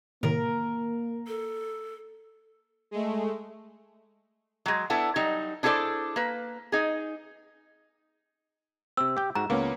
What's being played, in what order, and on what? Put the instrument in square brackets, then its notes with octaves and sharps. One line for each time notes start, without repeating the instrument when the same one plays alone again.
[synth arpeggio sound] A2 C3 D#3 [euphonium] A#3 [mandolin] A#4
[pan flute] A4
[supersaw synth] G#3 A3
[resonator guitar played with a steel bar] F#3 G#3
B3 D4 E4 A4
F#3 G3 D#4
D4 E4 G#4 A4 C5 D5
A#3 B4
D#4 G#4
[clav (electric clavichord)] C3 C4 [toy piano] E6
[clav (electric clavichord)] G4 G5
[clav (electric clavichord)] G#2 F#4 [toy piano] A#5
[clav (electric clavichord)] C#2 [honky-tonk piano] A#3 B3 C#4